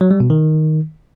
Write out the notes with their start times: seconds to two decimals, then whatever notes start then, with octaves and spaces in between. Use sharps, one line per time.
0.01 F#3
0.11 G3
0.20 B2
0.30 D#3